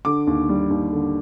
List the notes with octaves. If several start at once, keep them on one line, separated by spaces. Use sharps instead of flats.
D3 D6
D#2
G3
D#2
D3